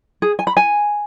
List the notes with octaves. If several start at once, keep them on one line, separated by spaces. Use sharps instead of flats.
G#4
G#5
B5
G#5